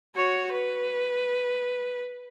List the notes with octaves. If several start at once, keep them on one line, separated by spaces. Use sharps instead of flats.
F#4 C#5
B4